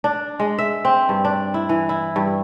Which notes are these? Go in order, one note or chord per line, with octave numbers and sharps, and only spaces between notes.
D4
G#3
E5
C4
G2
D4
E4
E3
E4
G2